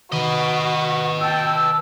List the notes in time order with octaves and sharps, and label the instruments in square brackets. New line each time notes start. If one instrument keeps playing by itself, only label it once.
[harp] D#3 [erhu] F#4 [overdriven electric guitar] B4 D#5
[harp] F#4 [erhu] G5 [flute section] A5 E6